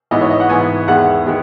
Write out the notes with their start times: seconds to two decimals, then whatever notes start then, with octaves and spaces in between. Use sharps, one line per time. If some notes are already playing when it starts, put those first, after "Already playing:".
0.11 G#2 E3 B3 D#5
0.21 C#5
0.30 D#5
0.40 F#5
0.49 G#2 E3 B3 G#5
0.88 E2 D#3 G#3 B3 F#5
1.26 D#3 G#3 B3